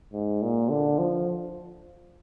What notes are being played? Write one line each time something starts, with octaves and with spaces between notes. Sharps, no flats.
G#2
A#2
D3
F3